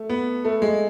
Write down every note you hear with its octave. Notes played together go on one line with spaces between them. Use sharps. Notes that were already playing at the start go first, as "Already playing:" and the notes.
Already playing: A3
B3
A3
G#3